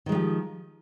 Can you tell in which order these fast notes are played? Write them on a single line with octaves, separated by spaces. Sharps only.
D#3 G#3 F3 G4